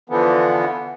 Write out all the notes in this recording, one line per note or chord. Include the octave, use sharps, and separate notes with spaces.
D3 E3 F3 B3